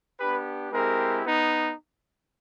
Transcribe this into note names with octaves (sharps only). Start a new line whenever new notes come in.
B3 D4 G4 B4
G#3 C4 E4 G4 A#4
B3 D#4